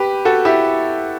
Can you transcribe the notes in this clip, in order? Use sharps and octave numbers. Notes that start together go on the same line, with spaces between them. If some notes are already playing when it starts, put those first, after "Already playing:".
Already playing: G4 B4
F#4 A4
E4 G4